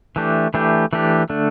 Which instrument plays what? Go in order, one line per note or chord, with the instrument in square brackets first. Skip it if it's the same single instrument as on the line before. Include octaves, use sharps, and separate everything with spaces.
[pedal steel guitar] E3 A3 D4 G4
E3 A3 D4 G4
E3 A3 D4 G4
D3 A3 D4